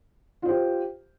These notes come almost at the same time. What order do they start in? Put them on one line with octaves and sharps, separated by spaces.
F4 C5 G4